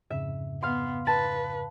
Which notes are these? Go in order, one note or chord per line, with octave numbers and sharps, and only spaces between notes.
F2 G#2 C#3 E5
B3 F5 C6
B4 A5